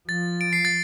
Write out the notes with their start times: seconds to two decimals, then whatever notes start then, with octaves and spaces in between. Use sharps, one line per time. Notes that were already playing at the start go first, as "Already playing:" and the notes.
0.09 F3 A6
0.41 D7
0.53 C7
0.65 A6